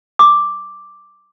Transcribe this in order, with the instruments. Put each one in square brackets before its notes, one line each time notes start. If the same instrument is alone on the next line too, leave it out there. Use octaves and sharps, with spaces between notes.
[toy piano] D6